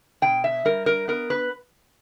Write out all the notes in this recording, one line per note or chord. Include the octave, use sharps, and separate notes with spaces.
B2 G5
E5
G3 A#4
A#4
B3 A#4
B4